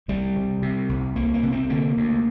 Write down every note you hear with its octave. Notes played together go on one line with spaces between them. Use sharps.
C2 G3
C3
C3
C2
C2 A#3
A#3
C3
C4
D3 A#3
D2